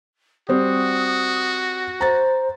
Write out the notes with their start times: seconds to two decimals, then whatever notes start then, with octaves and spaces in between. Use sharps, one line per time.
0.49 G3 C4 F#4 D#6
2.01 C5 A#5 A6